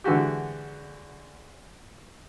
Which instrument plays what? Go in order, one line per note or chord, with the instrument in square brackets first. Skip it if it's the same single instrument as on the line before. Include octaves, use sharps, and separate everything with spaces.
[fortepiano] D3 E3 G#3 F#4 G4